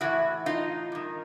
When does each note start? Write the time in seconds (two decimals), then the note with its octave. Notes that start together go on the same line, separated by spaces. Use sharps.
0.01 A2 E3 E4 F#4
0.46 D#4 F4
0.92 G2 D#3